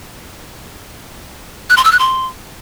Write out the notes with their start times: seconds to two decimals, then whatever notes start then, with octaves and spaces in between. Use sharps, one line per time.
1.70 F#6
1.77 C6
1.85 E6
1.92 F#6
1.99 C6